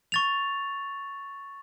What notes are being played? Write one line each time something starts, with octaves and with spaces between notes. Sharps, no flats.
C#6 A6 F7